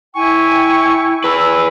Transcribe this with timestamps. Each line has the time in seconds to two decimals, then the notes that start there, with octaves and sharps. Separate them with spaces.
0.15 E4 G5 G#5 C#6
1.24 G#4 B4 E6